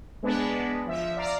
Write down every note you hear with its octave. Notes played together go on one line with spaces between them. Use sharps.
G#3 B3 D4 B4
F3 E5
D5 F5 A#5